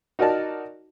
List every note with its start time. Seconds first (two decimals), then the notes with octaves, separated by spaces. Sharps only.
0.19 D#4 F#4 A#4 D5 A5